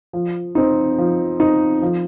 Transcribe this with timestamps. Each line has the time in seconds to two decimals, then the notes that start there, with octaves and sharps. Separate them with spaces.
0.13 F3
0.55 C4 D#4
0.98 F3
1.40 C4 D#4
1.82 F3